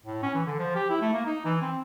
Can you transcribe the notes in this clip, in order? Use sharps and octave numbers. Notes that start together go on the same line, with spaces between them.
A2
C#4
E3
D3
F3
G4
E4
A3
A#3
D#4
E3
C4